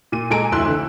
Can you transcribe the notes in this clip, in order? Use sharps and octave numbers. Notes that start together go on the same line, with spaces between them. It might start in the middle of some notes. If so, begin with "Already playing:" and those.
A#2 D#7
A#2 G#3 A4 G#5 A#5 D7
F1 D2 E4 C6 E6 F#6
D3 E3